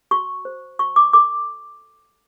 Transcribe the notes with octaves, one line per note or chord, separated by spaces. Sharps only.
F#4 C#6
C5
F#4 C#6
D6
A4 D6